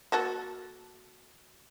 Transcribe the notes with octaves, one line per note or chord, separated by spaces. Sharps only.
A#3 F#4 A4